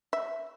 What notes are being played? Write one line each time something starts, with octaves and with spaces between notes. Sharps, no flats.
E5